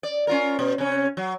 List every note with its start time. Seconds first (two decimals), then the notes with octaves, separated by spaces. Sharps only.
0.03 D5
0.27 C#4 F4 A#4
0.59 B2
0.78 C3 C#4
1.17 F#3